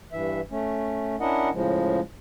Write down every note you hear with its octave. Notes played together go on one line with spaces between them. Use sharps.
G2 E3 E5
A3 C#4
C#4 D4 E4 A#4 D#5 F#5
A2 C#3 F3 G#3